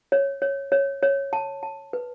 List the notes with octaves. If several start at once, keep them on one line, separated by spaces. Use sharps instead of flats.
C#5
C#5
C#5
C#5
A5
A5
B4